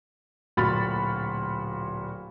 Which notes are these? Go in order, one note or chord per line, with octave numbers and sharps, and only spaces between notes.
D1 A#2 F#4 B5 F6 A6